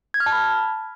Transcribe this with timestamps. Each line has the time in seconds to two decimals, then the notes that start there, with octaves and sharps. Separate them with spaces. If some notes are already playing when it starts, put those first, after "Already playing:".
0.14 G#6
0.20 F6
0.26 A5
0.32 B5